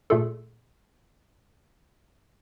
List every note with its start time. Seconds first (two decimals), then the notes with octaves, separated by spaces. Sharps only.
0.10 A#2 A3 F4 G#4 A4